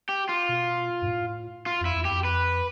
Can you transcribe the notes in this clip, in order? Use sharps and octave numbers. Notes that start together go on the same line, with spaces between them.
G4
F4
B2
G2
A2
F4
F2 E4
E2
G4
F2
B4